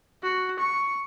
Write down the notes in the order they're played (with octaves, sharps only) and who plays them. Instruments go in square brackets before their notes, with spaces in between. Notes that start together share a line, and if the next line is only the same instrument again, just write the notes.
[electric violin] F#4
C#6